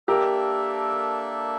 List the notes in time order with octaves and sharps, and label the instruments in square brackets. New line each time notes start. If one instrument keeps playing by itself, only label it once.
[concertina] A#3 D4 A4 E5 [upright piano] G4 A#4